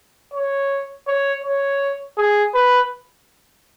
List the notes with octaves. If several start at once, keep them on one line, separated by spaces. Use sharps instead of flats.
C#5
C#5
C#5
G#4
B4